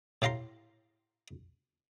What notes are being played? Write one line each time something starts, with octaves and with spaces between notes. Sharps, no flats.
A2 G4 F5 A#5 C6